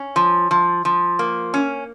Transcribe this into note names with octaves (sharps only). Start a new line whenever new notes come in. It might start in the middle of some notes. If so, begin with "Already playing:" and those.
Already playing: C#4
F3
F3
F3
A#3
C#4